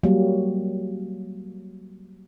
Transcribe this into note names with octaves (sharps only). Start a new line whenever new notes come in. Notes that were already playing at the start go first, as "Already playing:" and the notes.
F#3 G3 A#3